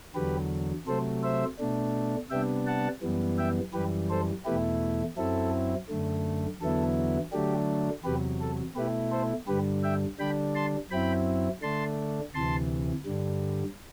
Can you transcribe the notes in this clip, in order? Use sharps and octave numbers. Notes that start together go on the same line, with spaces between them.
E2 D3 F#3 G4 B4
C3 F#3 A3 A4 C5
C5 E5
B2 A3 D4
C3 G3 B3 D4 E5 G5
F#5 A5
F#2 E3 G3 B3
E5 G5
F#2 E3 G3 G4 B4
A4 C5
E2 B2 A3 E4 G4 B4
F#2 F#3 C4 E4 A4
F#2 D3 A3
E2 D3 F#3 B3 E4 A4
D3 F#3 A3 D4 G4
E2 C3 F#3 G4 B4
A4
B2 A3 E4 G4 B4
A4 C5
G2 D3 G3 G4 B4
E5 G5
D3 G3 D4 G5 B5
A5 C6
F#2 F#3 C4 E4 G5 B5
D3 A3 D4 A5 C6
D2 C3 E3 A5 C6
G2 D3 G3